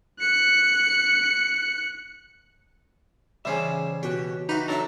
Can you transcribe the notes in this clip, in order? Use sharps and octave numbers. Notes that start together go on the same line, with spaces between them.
F#6 C#7
C#3 E3 G3 C#4 G#4 C5 E5 G#5
B2 F#4 G4 C#5
D#4 F#4 G4 B4 E5
F#3 D4 A4 D5 E5 A#5